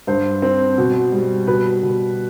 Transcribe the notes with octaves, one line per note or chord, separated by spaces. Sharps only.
G2 C5
C4
B2
G3
B2 B4
B2